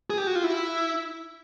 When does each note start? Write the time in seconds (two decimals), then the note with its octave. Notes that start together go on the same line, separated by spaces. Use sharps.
0.10 G#4
0.18 G4
0.27 F#4
0.35 F4
0.44 E4